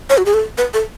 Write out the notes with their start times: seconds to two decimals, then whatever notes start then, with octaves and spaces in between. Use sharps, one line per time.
0.10 C#5
0.18 F#4
0.26 G#4
0.34 A4
0.58 B4
0.74 A4